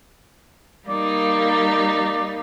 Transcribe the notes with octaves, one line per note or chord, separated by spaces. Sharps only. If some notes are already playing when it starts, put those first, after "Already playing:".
G3 A#3 D#4 D5